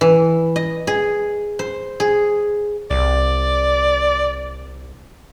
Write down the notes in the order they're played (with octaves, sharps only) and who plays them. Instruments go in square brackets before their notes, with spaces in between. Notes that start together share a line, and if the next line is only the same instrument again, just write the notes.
[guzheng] E3
D#5
G#4
C5
G#4
[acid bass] C2 [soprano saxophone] D5